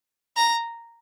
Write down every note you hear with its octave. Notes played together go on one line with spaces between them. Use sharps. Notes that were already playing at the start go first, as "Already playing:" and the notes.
A#5